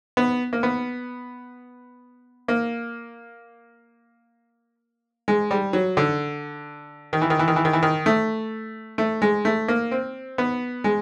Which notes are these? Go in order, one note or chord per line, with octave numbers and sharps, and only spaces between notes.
B3
A#3
B3
A#3
G#3
G3
F#3
D3
D#3
E3
D#3
E3
D#3
E3
D#3
E3
D#3
A3
A3
G#3
A3
A#3
C4
B3
G#3